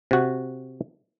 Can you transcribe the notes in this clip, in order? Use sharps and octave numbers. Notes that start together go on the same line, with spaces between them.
C3 F#4